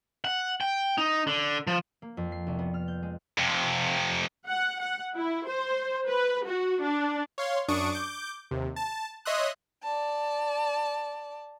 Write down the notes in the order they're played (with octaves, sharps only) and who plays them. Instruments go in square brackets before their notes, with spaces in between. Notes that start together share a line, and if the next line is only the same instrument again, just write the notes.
[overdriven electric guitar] F#5
G5
D#4
D3
F3
[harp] A#3
F2
C7
C2
B3
F6
G6
G#3
[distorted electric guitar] F2 C3
[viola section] F#5
F#5
E4
C5
B4
F#4
D4
[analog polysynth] C#5 F5 C6
F#2 D4 C#6 D#6 D7
D6 G6
D#2 C3
A5
C#5 D#5 E5 C6 D#6 F#6
[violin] D5 A5